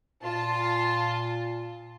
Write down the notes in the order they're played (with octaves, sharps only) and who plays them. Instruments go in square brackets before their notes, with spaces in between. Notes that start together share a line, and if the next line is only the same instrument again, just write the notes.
[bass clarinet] A#2 [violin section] F4 A5